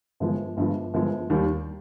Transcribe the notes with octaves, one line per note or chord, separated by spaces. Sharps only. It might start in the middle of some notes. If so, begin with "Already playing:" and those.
G1 G2 F3 G#3
G1 G2 F3 G#3
G1 G2 F3 G#3
D#2 D#3 G3